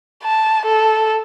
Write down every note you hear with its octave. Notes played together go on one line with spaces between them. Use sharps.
A5
A4